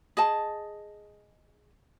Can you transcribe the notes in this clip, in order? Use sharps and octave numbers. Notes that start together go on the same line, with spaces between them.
G#4 D#5 A5